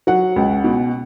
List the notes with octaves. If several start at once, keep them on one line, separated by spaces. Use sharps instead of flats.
F#3 F#5
C#2
B2